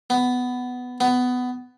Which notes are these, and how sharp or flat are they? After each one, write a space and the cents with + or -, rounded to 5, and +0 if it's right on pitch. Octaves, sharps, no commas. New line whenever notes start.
B3 +10
B3 +15